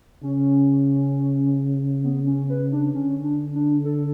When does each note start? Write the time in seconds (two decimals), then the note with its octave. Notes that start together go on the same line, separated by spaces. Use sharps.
0.23 C#3 C#4
2.04 B3
2.26 C#4
2.50 B4
2.72 D4
2.94 D3 C#4
3.24 D4
3.55 D4
3.85 A4